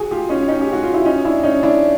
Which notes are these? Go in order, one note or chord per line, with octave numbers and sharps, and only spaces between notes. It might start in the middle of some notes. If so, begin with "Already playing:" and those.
Already playing: F#4 G#4
F4 G4
C#4 D#4
C#4 D#4
G4
F#4
F4
E4
C#4 D#4
D4 E4
C#4 D#4
D4 E4